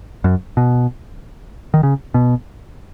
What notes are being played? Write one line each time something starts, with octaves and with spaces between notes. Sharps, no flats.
F#2
B2
D#3
C#3
B2